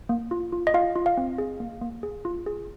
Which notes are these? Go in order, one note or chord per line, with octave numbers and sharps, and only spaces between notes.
A#3
F4
F4
D#5
F4 F5
F4
F5
C4
G#4
A#3
A#3
G#4
F4
G#4